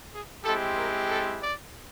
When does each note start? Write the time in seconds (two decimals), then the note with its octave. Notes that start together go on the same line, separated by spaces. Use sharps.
0.12 G#4
0.44 G#3 C4 E4 G4 A4
0.77 A#4
1.09 A4
1.42 D5